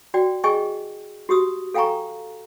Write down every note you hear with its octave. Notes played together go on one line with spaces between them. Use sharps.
F#4 D5 G5
G#4 D#5 G5 G#5 C#6
F#4 G4 D#6 E6
A4 F5 G5 G#5 A#5 C#6